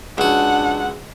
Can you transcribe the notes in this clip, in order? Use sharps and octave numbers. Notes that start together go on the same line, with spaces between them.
C#2 D4 F#4 F#5